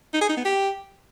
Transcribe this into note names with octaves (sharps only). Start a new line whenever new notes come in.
D#4
G#4
D#4
B3
G4